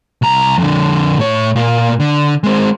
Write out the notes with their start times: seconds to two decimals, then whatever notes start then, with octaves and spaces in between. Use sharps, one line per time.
0.22 C2 A#5
0.58 F2 D3
1.19 A2 C#5
1.56 A#2 A#3
2.00 D3
2.44 G#3 C4